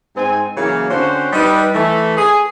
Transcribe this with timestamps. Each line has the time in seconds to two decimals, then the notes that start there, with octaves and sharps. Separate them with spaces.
0.16 G#2 C4 G#5
0.57 C#3 E3 F#3 A#3
0.90 D3 C4 C#4 F#4 C5
1.33 G3 D#4 B4
1.74 E3 A3
2.17 G#4